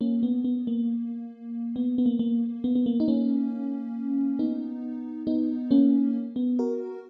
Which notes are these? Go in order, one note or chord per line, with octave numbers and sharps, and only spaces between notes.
A#3 C#4
B3
B3
A#3
B3
B3
A#3
A#3
B3
B3
A#3
D#4
A#3 C#4
B3 D#4
B3 D#4
A#3 C#4
B3
F#4 A#4